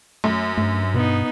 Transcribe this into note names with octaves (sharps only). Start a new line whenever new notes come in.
F#2 A3
G2 A3
B2 B3 D#4